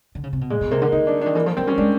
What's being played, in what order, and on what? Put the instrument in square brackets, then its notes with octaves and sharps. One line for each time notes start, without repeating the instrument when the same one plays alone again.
[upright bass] D3
C#3
C3
B2
[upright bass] A#2 [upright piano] G#3
[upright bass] B2
[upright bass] C3 [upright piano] A#3
[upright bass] D3
[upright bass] D3 [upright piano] D#4
[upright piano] D4
[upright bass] D#3 [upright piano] D4
[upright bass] E3 [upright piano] A#3
[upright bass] F3 [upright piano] A#3
[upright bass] F#3 [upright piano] C4
[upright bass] G3 [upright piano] C#4
[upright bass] G#3 [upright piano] D4